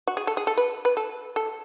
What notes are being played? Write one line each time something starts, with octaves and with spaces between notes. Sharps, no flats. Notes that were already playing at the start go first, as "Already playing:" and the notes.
F#4
G#4
A4
G#4
A4
B4
B4
A4
A4